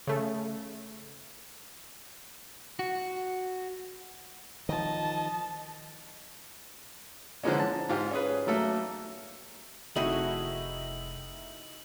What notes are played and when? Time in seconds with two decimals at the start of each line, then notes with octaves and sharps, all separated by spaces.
0.07 C#3 A3
2.79 F#4
4.69 D#3 F3 D#5 A5
7.43 D3 E3 F3 G#3 A#3 C#4
7.59 A5
7.89 G#2 F4 G4
8.11 C#4 G#4 B4
8.47 F#3 A3 A#3 A4
9.96 F1 A3 C4 D#4 E4 F#4 G#4 F#7